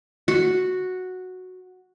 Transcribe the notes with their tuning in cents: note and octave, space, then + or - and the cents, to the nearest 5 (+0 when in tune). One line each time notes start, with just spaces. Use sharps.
F#4 -5